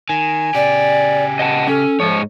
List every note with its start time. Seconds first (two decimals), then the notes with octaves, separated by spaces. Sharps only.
0.10 D#3 G#5
0.55 C#3 G4 D5
1.39 D#5 F#5 A5
1.67 C#4 A4
2.00 G#2 F3 C#5